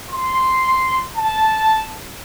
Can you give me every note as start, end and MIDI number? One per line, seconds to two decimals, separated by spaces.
0.11 1.03 84
1.17 1.88 81